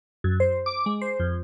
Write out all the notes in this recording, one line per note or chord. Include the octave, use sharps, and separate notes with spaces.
F#2
C5
D6
G#3
C5
F2